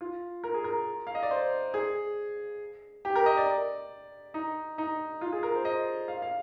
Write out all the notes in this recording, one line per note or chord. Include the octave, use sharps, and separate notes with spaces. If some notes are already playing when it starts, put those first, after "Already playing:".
F4
A#4
G#4
A#4
F5
D#5
D5
C5
G#4
G4
A#4
D#5
D5
D#4
D#4
F4
G#4
A#4
C5
D#5
F5
F5